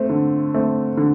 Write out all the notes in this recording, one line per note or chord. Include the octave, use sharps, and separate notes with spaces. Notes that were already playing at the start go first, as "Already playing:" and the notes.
Already playing: A3 C4
D3
A3 C4
D3